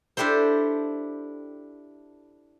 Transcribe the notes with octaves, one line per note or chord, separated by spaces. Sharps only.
D4 E4 G4 A4 C5